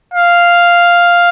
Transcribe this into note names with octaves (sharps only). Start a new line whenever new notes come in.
F5